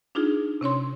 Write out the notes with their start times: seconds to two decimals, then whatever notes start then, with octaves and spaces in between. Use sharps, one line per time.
0.15 D4 D#4 F4 G#4
0.61 C3 C#4 C#5 C6